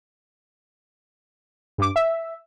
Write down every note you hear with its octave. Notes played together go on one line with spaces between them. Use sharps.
G2 D6
E5